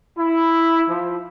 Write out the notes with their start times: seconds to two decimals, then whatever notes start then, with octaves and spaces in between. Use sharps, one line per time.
0.18 E4
0.88 F3